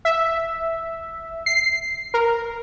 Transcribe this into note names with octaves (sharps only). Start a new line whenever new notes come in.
E5
C7
A#4